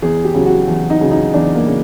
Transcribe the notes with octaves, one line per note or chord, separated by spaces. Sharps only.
E2 G#4
G4
C#3 F#3
F#4
E2
D#4
C#3 F#3
D#4
E2 D4
A#3
C#3